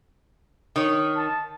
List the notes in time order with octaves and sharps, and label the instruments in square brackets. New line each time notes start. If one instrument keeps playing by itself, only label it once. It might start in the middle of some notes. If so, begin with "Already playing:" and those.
[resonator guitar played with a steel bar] D#3 C#5
[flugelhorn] A5